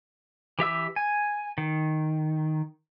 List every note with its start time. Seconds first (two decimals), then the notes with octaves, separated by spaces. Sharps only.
0.59 E3 G4 E5 E6
0.96 G#5
1.58 D#3